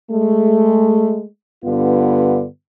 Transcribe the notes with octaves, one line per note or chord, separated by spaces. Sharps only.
G#3 A3
G2 D3 B3 F4